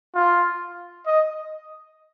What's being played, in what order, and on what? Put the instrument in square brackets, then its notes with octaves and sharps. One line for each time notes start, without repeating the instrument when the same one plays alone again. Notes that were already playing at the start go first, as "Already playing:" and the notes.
[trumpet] F4
D#5